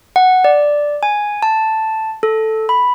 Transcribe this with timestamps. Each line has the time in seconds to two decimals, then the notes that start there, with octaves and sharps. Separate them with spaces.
0.16 F#5
0.44 D5
1.03 G#5
1.43 A5
2.23 A4
2.69 B5